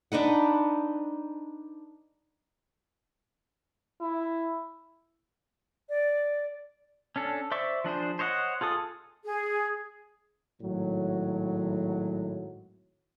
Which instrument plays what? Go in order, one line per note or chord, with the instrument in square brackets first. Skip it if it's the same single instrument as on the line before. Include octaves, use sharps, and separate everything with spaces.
[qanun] D4 D#4 B4 F#5
[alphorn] E4
[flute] D5
[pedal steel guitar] C#4 D4 A4
C5 D5 E5 C#6 D6
F3 D4 G#4 C5
C5 C#5 D#5 F5 F#5
F4 G#4 A4 D#6
[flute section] G#4
[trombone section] G#1 A2 F#3